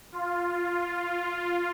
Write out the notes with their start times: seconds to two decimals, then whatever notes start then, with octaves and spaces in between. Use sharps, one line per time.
0.12 F4